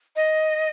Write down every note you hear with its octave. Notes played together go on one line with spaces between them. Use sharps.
D#5